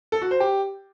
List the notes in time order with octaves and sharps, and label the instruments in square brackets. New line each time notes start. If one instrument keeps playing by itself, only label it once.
[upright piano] A4
F#4
C5
G4